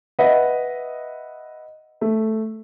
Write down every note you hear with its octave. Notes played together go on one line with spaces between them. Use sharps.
B4 D#5 E5 F#5
A3